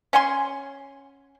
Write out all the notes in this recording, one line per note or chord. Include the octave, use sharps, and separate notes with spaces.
C#4 F#5 G#5 C6